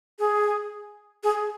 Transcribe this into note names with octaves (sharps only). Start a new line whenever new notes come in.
G#4
G#4